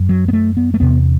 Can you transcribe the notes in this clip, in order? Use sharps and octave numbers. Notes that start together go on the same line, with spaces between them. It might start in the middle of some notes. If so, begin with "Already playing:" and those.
Already playing: F#2
F#3
B3
A3
B3
A3
E2 C3 B3